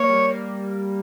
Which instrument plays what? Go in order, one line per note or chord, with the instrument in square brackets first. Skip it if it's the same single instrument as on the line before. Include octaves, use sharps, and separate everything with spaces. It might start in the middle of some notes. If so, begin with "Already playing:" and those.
Already playing: [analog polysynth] A#3 [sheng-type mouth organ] C#5
[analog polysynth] G3
A#3